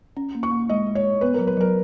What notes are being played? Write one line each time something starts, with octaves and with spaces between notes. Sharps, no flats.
C#4
A#3
C#6
A#3
G#3 D#5
G#3
C#5
G#3
B3 B4
F#3 A#4
B4
F#3 A#4